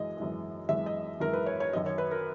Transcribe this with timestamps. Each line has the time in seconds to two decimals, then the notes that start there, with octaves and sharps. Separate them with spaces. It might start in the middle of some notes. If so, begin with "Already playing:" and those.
Already playing: F#2 E3 G#3 D#5
0.17 F#2 E3 G#3
0.68 F#2 E3 G#3 E5
0.86 D#5
1.20 F#2 E3 G#3 A#4
1.33 B4
1.46 C#5
1.60 C#5
1.73 F#2 D#3 F#3 D#5
1.86 C#5
1.98 B4
2.11 A#4